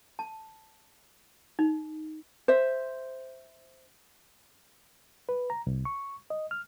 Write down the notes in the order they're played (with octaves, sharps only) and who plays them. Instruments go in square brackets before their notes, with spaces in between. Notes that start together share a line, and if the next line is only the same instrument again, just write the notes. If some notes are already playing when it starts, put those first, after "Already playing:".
[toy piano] A5
D#4
[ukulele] C5 E5
[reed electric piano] B4
A#5
C2
C#6
D#5
F6